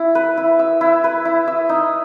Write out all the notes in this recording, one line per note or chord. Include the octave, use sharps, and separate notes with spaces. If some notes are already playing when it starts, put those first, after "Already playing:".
Already playing: E4
B4
E4
E5
E4
B4
E4
E5
D#4